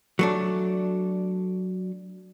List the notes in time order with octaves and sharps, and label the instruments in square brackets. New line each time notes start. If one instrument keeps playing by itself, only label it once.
[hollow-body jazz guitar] F#3 A3 D4